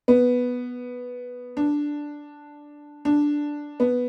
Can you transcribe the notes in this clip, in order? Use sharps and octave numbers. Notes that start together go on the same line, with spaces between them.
B3
D4
D4
B3